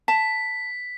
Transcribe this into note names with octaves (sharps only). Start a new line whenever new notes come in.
A5 B6